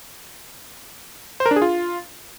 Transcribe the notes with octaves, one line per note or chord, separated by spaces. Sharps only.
C5
A#4
D4
G#4
F4